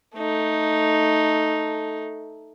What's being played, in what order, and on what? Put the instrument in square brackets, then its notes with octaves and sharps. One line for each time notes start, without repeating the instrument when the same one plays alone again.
[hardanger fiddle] A3 D#4